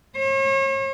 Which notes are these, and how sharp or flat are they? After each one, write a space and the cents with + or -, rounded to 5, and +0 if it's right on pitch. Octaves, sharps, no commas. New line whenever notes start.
C#5 -40